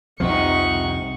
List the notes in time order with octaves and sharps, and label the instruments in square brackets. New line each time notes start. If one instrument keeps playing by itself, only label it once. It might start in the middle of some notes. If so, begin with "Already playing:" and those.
[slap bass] C2 F2 F3 [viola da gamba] C3 D#4 [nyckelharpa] F#5 C#6